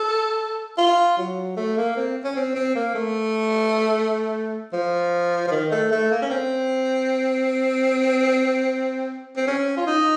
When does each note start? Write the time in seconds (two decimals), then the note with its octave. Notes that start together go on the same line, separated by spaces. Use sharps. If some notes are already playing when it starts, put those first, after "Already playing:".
Already playing: A4
0.78 F4
1.18 F#3
1.57 A3
1.77 A#3
1.97 C4
2.24 C#4
2.36 C4
2.55 C4
2.75 A#3
2.95 A3
4.73 F3
5.47 F3
5.51 D#3
5.71 A3
5.92 A3
6.12 A#3
6.22 C#4
6.30 C4
9.37 C4
9.47 C#4
9.77 F4
9.87 D#4